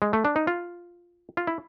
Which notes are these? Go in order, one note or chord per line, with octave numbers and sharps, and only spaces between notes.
G#3
A3
D4
D#4
F4
F4
E4